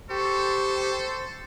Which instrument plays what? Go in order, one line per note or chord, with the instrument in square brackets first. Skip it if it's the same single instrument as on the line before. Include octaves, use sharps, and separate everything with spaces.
[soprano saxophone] G4 [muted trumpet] A4 [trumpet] C5 [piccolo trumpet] C#6